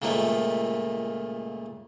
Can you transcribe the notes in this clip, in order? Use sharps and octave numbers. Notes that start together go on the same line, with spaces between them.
C#2 A#2 D#3 F3 A3